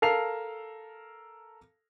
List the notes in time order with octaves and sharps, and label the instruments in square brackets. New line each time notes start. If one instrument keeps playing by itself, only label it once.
[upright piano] A4 A#4 F5 C7 F7